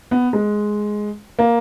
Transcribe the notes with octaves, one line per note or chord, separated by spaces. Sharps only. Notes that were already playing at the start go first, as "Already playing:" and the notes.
B3
G#3
A#3